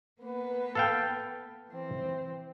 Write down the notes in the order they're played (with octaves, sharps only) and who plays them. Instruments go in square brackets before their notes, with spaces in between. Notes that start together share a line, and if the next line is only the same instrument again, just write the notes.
[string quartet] A#3 B3 B4
[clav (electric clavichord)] A4 F5 G5
[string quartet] E3 C4